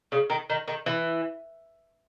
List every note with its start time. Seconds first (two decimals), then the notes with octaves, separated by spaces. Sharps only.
0.12 C#3
0.30 D#3
0.50 D#3
0.68 D#3
0.86 E3